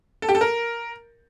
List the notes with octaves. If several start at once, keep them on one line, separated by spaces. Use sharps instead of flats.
A4
G4
A4
A#4